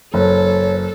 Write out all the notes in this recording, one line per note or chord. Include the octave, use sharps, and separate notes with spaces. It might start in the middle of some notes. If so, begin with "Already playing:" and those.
F#1 A4 C#5